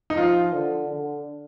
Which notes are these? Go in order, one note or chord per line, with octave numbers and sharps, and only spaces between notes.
D#4
F3 F4
D3
D3